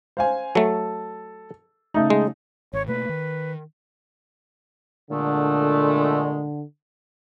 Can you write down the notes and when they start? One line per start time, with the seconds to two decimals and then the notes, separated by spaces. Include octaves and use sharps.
0.17 C5 F5 G#5
0.55 F#3 A3 A4
1.94 C#3 A3 D#4
2.10 G#3
2.73 G#1 C#5
2.88 B2 A3 A#3 B4
3.09 D#3
5.11 A#2 D3 G#3 A3